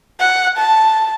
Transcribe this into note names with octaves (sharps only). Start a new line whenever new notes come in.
F#5
A5